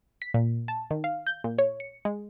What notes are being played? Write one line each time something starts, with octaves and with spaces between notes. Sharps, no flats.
B6
A#2
A5
D#3
F5
G6
A#2
C#5
C#7
G#3